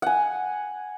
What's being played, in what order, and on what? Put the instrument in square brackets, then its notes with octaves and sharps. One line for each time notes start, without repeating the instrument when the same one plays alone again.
[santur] F#5 G#5